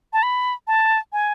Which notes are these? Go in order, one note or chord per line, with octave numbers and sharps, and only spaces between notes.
A5
B5
A5
G#5